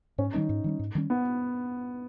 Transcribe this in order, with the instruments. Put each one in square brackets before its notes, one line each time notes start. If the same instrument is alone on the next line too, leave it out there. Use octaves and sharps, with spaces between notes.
[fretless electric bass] G#2 [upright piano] C#4
[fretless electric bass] D#3 G3 C#4 [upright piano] D#4
[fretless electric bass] G#2
D#3 G3 C#4
G#2
D#3 G3 C#4
[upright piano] B3